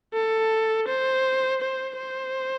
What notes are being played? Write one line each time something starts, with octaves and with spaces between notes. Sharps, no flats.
A4
C5
C5
C5